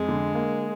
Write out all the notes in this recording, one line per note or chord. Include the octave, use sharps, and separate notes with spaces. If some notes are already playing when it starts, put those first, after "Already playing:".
Already playing: F2 G#3
D3
A#3